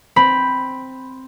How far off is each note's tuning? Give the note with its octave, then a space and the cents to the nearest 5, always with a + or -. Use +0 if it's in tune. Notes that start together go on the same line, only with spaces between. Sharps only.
C4 +0 B5 +0